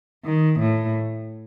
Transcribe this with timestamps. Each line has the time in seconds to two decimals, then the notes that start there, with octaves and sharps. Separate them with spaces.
0.25 D#3
0.59 A2